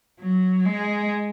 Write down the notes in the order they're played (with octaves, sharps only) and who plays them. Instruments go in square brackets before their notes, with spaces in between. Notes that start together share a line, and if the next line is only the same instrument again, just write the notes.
[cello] F#3
G#3